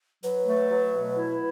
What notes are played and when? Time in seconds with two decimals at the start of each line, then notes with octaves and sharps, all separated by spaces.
0.23 F#3 B4
0.46 A3
0.70 F#3
0.94 B2
1.17 E4